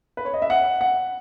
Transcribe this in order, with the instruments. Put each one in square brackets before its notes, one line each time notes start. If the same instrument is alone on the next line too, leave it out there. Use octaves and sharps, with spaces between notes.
[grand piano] B4
C#5
D#5
E5
F#5
F#5